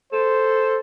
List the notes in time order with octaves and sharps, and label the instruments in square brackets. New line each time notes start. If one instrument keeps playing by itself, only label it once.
[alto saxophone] A4 [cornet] C5